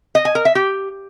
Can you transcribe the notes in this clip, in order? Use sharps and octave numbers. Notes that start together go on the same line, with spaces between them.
D#5
G#5
A#4
E5
G4